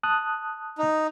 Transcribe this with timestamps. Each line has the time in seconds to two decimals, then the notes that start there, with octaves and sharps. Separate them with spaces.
0.03 A5 D#6 F#6
0.78 D#4